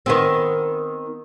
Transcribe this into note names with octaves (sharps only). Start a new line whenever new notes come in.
D#3 B3 C4